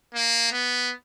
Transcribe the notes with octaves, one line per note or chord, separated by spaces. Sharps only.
A#3
B3